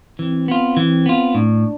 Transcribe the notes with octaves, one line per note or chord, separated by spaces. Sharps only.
E3 C4
B3 F4
E3
B3 F4
A2 D4